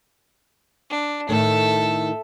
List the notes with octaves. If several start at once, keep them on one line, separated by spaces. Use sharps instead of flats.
D4
A2 D#3 A3 A4 E5